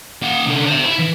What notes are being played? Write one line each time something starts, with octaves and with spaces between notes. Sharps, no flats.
A#3 F#5
C2 D3
C5 E5
E4
E3